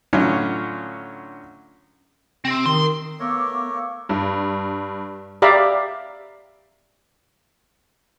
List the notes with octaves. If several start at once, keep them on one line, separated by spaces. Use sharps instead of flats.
A2 D3 F#3 C#4 F4
C3 C4
D#3 C6
A3 B3 A#4 C#5 F5 D6 E6
G2
G4 D5 E5 F5 A#5 B5